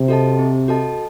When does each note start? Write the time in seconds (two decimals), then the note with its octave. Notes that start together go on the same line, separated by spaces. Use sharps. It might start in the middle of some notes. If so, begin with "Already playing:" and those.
Already playing: C3
0.08 F#4 A4 D#5 A5
0.39 C4
0.68 F#4 A4 D#5 A5